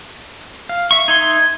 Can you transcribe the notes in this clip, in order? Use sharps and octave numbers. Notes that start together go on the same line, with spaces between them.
F5
E5 C#6
D#4 E5 C6 G#6